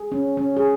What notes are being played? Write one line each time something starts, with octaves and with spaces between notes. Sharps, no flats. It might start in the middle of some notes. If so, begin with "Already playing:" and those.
Already playing: G#4
C#4
C#4
G#4